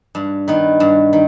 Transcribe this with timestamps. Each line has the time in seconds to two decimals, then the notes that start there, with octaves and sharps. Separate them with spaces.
0.15 G2
0.48 D#3 B3
0.80 G2
1.13 D#3